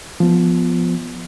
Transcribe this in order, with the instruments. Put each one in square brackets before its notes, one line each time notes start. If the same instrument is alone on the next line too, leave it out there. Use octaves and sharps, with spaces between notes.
[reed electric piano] F3 B3